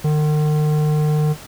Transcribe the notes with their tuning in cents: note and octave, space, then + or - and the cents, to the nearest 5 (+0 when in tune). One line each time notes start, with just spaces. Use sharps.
D#3 -45